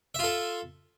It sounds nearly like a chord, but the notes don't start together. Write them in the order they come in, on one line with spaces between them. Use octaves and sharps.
E5 F4 A4